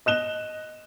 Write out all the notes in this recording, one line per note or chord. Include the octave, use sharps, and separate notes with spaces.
D#5 F#6 E7 G7